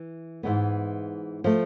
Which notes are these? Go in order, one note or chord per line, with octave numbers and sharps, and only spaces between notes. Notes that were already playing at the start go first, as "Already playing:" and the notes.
Already playing: E3
G#2 E3 G#3 B3
F3 A3